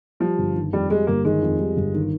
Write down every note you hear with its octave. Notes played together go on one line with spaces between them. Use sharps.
F3 G3
G1
D#3
F2 G3
G3 G#3
G1 A#3
D#3 G#3
F2
G3
G1
D#3